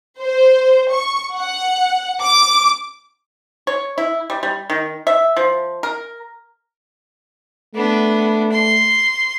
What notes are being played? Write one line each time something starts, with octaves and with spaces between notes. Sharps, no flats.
C5
C#6
F#5
D6
C#5
E4
G3
G3
D#3
E5
F3
A#4
A3 B3 D4
C6